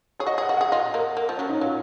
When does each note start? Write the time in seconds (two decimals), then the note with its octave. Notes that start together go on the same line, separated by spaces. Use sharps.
0.19 G#4 C#5
0.26 F#4 D#5
0.38 G#4
0.42 F#5
0.49 F#4
0.57 G#4 F#5
0.72 F4 D#5
0.94 A#3
1.17 A#3
1.29 F3
1.37 F#3 C#4
1.49 D#4
1.61 F#3 F4